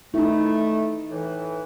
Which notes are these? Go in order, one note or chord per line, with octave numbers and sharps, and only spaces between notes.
A3 D#4 E4
A2 E3